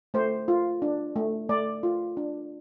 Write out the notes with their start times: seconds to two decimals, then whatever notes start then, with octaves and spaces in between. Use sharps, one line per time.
0.14 A3 C5
0.48 F4
0.82 D4
1.16 A3
1.49 A3 D5
1.83 F4
2.17 D4